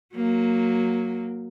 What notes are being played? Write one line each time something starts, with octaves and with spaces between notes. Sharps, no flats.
F#3 A#3